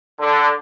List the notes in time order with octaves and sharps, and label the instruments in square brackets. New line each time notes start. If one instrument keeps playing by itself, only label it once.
[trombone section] D3